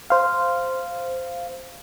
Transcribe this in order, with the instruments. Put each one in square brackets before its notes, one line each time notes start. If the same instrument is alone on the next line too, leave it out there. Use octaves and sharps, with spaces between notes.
[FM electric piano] C5 F5